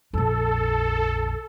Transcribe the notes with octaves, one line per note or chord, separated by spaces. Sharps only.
A#1 F2 A4